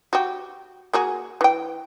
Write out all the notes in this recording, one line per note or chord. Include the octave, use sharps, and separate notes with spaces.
F#4 G4
A#3 F#4 G#4
E3 G5